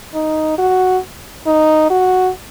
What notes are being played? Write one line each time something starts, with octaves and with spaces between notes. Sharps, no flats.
D#4
F#4
D#4
F#4